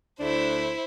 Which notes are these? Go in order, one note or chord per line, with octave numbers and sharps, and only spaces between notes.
D2 A3 D4 E4 C5